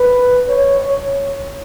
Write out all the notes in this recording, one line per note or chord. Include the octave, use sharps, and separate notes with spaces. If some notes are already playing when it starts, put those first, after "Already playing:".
Already playing: B4
C#5
C#5